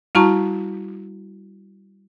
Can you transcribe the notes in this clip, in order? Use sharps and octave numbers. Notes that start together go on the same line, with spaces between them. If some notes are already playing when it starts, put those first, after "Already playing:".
G3 E4 F#4 A5 A#5 C#6